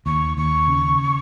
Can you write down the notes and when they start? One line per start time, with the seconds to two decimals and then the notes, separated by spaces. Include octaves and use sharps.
0.06 D#2 C#6
0.37 D#2 C#6
0.68 C#3